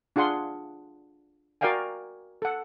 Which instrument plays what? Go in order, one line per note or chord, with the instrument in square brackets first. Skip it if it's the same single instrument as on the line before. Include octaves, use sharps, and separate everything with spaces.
[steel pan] D4 F4 G#4 F#5 C6
F#4 A#4 D5 F5 G5 G#5
A4 F#5